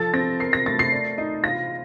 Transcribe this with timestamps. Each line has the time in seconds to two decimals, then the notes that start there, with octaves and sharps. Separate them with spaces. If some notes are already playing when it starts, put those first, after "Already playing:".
Already playing: F3 A4 A6
0.13 C4 A#6
0.40 A#4 C7
0.53 A#6
0.66 A3 A6
0.79 C7
0.92 D5
1.18 D#4
1.44 F4 A#6